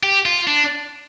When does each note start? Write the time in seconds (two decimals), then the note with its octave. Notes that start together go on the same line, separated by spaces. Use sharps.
0.03 G4
0.26 F4
0.47 D4